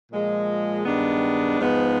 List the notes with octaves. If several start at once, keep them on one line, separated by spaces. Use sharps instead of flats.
A#2 F3 G#3
G2 D#3 G#3 B3 D4
G#2 F3 G#3 B3